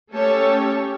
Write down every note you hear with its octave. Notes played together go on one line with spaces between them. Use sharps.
A3 C#4 G4 A4 C#5